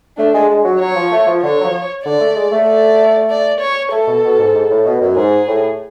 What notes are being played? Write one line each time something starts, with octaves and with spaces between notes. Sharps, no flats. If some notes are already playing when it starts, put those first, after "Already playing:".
A3 D4
G#3
G#3
F#3
F#3 C#5
F3
A3
F3
D3 C#5
F#3
F3
D3 D5
A3
G#3
A3
D5
D5
C#5
A3 A4
B2
B2
G#2
G#2
A2
B2
F#2
G#2 G#4
A2